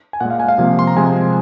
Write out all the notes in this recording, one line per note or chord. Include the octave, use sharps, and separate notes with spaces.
G#5
A#2 G#3 F#5
F5
G#5
F5
C3 F3 A#3
C6
A#5
C3 F3 G#3 G#5